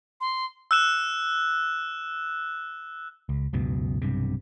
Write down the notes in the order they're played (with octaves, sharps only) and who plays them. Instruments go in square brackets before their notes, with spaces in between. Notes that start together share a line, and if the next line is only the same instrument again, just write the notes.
[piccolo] C6
[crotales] E6 F#6 E7
[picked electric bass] C#2
C#2 F#2 B2
B1 G2 C3